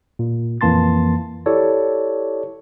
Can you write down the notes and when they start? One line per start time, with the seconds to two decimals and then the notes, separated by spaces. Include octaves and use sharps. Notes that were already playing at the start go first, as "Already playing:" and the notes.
0.19 A#2
0.61 F2 E3 A#3 A5 C6 A6
1.46 E4 G4 A4 C#5 D5